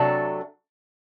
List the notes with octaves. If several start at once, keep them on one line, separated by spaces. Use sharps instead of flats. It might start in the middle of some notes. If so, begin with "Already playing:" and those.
Already playing: C3 F#3 A3 D4 A4